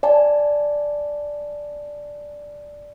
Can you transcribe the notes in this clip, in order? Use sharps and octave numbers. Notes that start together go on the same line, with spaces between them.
D5 G#5 A5